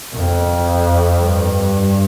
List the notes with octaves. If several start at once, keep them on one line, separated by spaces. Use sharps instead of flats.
F2
G2